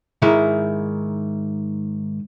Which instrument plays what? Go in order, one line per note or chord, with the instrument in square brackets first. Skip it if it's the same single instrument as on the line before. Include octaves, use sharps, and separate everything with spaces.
[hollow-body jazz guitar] G#2 D#3 E4